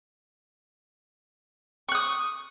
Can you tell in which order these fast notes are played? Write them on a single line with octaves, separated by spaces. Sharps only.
C#6 F#6 D#6